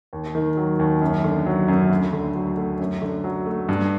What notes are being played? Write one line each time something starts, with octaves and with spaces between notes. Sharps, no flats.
D#2
D#3
F#3
D#2
F#2
D3
F#3
F#2
D2
D3
F#3
A3
F#2
D3
F#3
A3
G2